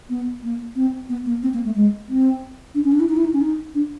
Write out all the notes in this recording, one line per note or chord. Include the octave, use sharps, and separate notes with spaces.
B3
A#3
C4
B3
A#3
C4
A#3
A3
G#3
C4
D4
C#4
D4
E4
D#4
E4
D#4
C#4
D#4
D4